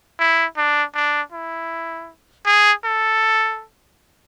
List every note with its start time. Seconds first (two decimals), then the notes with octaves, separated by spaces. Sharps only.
0.19 E4
0.57 D4
0.95 D4
1.32 E4
2.46 G#4
2.85 A4